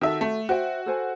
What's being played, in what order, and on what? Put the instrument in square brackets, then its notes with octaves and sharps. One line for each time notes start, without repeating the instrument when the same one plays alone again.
[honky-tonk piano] D#3 E5 [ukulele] F#4 A4
[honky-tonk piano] A3
[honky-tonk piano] F#4 [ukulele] C5 E5 G5
[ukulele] A4 C5 G#5